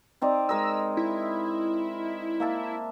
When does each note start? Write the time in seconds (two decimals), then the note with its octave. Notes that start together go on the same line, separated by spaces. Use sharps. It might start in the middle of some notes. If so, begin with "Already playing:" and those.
0.22 C4 D#4 D5
0.49 G#3 A#4 D#5 E6
0.97 E4
2.40 A#3 E5 A5